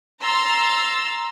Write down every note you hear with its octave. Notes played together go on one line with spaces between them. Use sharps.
A#5 C6 E6 A6